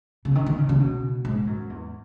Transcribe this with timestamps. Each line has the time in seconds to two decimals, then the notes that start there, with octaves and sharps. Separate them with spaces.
0.25 C#3
0.35 D#3
0.46 D#3
0.58 C#3
0.69 C#3
0.80 B2
1.25 G#2
1.47 F#2
1.70 E2